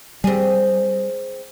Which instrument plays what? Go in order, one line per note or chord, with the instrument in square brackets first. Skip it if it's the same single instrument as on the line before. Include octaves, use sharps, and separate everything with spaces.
[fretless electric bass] G3 [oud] C4 G#4